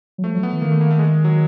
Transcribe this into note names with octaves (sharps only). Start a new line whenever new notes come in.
F#3
F3 A3
F#3
B3
E3
D#3 A#3
A3
A#3
A3
G#3
F#3